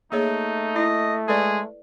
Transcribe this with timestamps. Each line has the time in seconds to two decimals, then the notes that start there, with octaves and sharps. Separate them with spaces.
0.12 A3 A#3 D#4 G#4 C#5
0.76 E4 D#5
1.28 G#3 G#4 A4 B4 D5